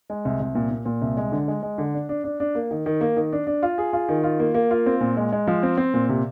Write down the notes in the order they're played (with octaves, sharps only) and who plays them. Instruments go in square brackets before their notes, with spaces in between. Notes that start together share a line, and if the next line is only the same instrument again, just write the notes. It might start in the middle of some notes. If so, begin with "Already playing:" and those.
[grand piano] G#3
C2
C2
A#2
A#2
A#2
C2
G#3
D3
G#3
G#3
D3
D4
D4
D4
D4
A#3
D#3
D#3
A#3
D#3
D4
D4
F4
G#4
F4
D#3
F4
A#3
A#3
F4
C4
A#2
G#3
G#3
F3
C4
C4
A#2
C3